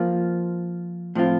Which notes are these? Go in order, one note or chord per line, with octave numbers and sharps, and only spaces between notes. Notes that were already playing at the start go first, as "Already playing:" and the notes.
Already playing: F3 A#3 F4
A2 F3 C4 F4